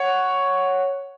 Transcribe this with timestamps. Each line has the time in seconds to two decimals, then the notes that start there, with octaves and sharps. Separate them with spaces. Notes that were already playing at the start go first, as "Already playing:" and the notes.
Already playing: C#5 F#5